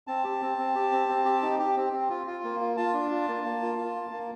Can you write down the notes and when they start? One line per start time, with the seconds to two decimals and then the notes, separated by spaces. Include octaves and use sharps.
0.07 C4 A5
0.24 G4
0.42 C4
0.58 C4
0.75 G4
0.92 C4
1.09 C4
1.25 G4
1.42 D#4
1.59 G4
1.76 C4
1.93 C4
2.10 F4
2.27 F4
2.44 A#3
2.60 F4
2.77 F4 A5
2.94 D4
3.11 F4
3.28 A#3
3.44 A#3
3.62 F4
3.78 F4
3.96 A#3
4.12 A#3